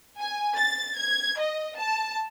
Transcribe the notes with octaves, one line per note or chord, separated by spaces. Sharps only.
G#5
A6
G#6
D#5
A5